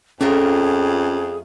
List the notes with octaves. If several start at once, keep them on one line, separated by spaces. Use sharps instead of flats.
F2 A3 C#4 F4 G#4 A#4